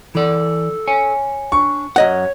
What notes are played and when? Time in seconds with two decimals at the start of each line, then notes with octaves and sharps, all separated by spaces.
0.15 E3 A4 D5
0.88 C#5 G#5
1.52 D4 C#6
1.96 F#2 C#5 D#5 F#5